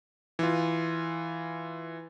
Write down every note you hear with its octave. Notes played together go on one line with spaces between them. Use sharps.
E3 F4